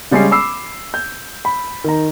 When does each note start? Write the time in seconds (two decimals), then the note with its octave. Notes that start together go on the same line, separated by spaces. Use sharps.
0.11 C#3 G3 G#3 C#4 G#4 C7
0.31 B5 D6 E6 C7
0.94 G6
1.45 B5
1.84 D#3 A#5